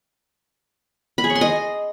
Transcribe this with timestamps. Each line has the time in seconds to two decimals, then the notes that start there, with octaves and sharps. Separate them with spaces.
1.18 B5
1.24 G#4
1.30 C#5
1.35 C6
1.41 D#5